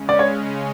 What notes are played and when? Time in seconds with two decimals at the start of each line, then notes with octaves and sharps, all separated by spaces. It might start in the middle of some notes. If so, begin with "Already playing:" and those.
Already playing: C#3 G#3 C#4
0.09 D5
0.19 C#5